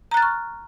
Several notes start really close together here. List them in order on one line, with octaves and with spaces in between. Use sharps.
A#5 F#6 A6 F6 C#6